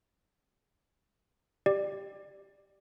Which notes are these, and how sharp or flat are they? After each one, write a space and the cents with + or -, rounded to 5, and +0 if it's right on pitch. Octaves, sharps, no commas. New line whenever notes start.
G4 +0 D5 +15